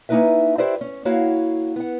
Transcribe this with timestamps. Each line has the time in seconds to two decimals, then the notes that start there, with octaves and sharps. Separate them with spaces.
0.09 A#3 C#4 D#4 E4 B4 E5
0.58 E4 G4 B4 C5 D5 E5
0.81 C#4
1.05 A#3 E4 F#4 C#5 F5
1.76 B3 F#5